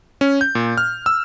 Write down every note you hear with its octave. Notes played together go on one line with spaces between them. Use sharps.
C#4
G6
A#2
F6
E6